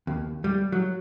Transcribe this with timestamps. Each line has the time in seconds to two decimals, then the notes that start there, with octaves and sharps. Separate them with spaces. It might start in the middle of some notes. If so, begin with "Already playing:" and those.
0.07 D#2
0.44 G3
0.72 F#3